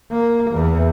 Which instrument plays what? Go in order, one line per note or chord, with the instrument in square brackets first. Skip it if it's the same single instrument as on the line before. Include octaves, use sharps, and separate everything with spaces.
[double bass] A#3
E2